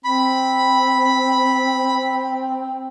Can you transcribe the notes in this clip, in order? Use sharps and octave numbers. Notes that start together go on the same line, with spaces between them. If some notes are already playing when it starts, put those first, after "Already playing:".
C4 B5